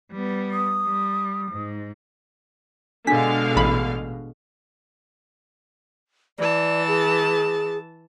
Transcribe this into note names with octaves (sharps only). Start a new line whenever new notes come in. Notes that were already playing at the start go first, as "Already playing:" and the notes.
G3 B3
D#6
G3
G#2
B2 D3 G#3 D4 F5 B6
A1 B5
E3 D5 A5
G#4